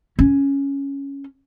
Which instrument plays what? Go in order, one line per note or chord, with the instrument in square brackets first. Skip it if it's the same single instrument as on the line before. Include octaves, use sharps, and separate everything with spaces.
[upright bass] C#4